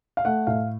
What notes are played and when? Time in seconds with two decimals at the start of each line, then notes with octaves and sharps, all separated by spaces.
0.17 F5
0.25 A3 F#5
0.47 A2 F5